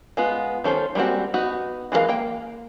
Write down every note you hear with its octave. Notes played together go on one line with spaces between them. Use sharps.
G#3 B3 F4
D#3 C#4 A4 C5
G3 G#3 A#3 C4 F#4
B3 D#4 F#4
E3 G#3 F#4 A#4 F5
A#3 G5